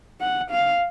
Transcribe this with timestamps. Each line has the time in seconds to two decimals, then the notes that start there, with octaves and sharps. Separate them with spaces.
0.21 F#5
0.51 F5